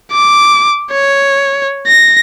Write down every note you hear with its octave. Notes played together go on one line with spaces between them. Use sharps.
D6
C#5
A#6